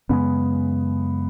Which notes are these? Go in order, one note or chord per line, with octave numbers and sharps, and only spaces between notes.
F#2 C#3 G#3 B3